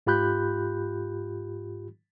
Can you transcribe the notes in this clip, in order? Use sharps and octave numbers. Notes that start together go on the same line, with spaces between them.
G#2 F4 G4 B5 F#6 G6